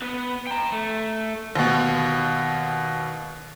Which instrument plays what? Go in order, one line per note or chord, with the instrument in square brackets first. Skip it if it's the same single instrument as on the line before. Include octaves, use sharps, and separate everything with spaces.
[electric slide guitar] B3 B4
G5 A#5
A3
[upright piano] D#2 B2